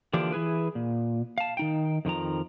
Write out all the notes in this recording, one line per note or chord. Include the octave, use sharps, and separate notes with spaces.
D3 E3 F3 A#3 D4 G4
E3 E4 G#4 B4
A#2
F5 A5
D#3 D#4 G5
F2 D#3 F3 A#5